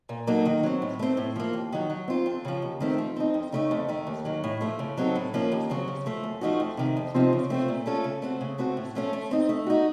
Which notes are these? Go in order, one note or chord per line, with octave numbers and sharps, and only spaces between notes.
A#2
F#3 A#3 D#4 A4
D#3
F#3 C4
A2
A3 C4
A2
F3 A#3
D#2
D#3 F#3
F#3
C4 F4
F2
C#3 F3
D#2
D#3 A3 C4
F3
C4 D#4
F2
C#3 A3 D#4
F2
D#3 A3
D#2
D#3 F#3
A2
F3 A3
C#3
F#3 C4 D#4 A4
A2
F3 A#3 C#4
D#2
C#3 F#3 C4
C#3
F3 A3
F#2
F3 A3 D#4 F#4
F2
C3 D#3
F2
C3 F3 C4 D#4
C#3
A3 C4 F4
A#2
A3 C#4 F4 A4
C#3
A3 C4 F#4
C#3
A3 C4 F#4
A2
F3 A3 C#4 A4
A3
C4 D#4
A3
D#4 F#4